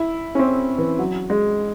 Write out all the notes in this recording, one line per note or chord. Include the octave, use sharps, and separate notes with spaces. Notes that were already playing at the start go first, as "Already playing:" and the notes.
Already playing: E4
C#4
C4
E3
F#3
G#3